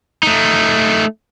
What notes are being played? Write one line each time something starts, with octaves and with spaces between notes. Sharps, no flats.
A3 D#4